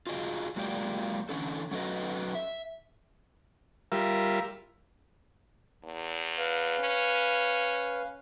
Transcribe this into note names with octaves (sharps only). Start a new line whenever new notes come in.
F4 F#4 G#4 D#5
F#3 G#3 A#3 F4 G4 D5
D3 E3 C#4 A4
F#3 C#4 F#4 A4 B4 D#5
E5
G3 F4 A#4 E5
E2
B4 F5
C#4